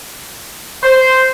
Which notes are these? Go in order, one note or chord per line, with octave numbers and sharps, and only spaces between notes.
C5